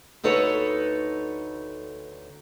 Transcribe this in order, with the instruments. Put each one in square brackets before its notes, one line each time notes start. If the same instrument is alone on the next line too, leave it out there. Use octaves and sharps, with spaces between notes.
[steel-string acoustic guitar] D2 D#4 A4 B4 C#5